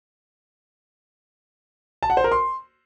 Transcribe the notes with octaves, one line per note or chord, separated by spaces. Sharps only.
A5
F#5
C5
A#4
C6